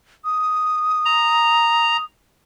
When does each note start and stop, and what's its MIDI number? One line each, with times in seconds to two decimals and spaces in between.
0.25 2.05 87
1.05 1.97 82